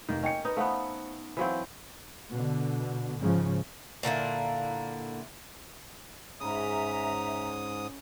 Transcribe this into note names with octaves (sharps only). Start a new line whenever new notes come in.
F1 D#3 A#3
C#4 D#5 G5 C#7
D#4 B4
A3 B3 C5 F5 F#5
E3 F#3 C4 C5 F5
B2 D3
G#2 C#3 F3
A#2 D3 A#3 E4
G#2 C#3 C#4 E5 A#5 D#6